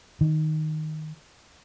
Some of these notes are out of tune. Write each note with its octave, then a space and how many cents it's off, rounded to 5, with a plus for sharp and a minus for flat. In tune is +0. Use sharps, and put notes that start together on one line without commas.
D#3 +0